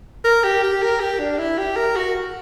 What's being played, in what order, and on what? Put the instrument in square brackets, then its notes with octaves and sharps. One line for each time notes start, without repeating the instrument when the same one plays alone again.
[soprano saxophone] A#4
G4
G4
A#4
G4
D4
E4
G4
A#4
F#4